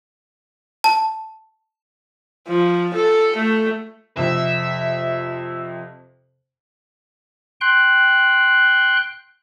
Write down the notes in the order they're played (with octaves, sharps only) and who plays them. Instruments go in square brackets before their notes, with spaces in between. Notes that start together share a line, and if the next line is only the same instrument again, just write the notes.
[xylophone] A5
[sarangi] F3
A4
A3
[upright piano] F2 C3 [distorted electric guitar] E5
[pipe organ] G5 C6 F#6